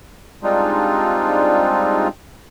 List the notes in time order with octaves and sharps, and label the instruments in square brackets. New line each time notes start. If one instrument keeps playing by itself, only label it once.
[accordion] G3 G#3 C4 D4 D#4 F4